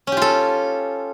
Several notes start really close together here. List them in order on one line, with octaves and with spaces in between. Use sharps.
C#4 G4 F4 A4